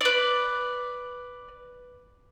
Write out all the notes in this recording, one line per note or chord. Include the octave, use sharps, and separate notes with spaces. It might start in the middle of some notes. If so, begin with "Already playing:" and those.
B4 D5